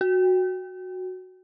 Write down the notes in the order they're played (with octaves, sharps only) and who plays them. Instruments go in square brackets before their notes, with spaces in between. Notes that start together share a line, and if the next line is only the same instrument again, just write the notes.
[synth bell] F#4